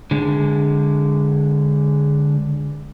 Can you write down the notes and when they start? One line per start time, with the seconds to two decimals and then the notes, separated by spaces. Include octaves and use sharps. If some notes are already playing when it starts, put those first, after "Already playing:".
0.11 D3 G#3